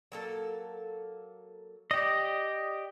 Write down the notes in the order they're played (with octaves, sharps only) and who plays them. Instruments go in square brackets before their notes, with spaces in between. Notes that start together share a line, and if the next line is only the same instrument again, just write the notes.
[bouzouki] F#3 A#3 A4
[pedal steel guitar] G4 D#5 [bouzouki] D5